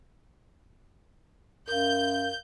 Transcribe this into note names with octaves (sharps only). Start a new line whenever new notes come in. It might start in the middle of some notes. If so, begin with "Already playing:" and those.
F#2 A#4 F5 G6